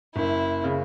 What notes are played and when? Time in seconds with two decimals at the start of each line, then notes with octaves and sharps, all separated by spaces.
0.15 F#1 E4
0.64 C#3